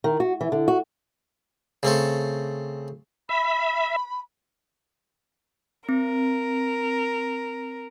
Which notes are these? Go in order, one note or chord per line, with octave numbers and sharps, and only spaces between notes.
D#3
F#4
E3
D3
F#4
C#3 A3 C4 A4
E5 B5
C4 A#4